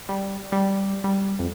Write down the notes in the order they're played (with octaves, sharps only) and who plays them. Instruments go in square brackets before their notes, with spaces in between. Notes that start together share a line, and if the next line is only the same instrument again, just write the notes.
[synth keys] G3
G3
G3
F2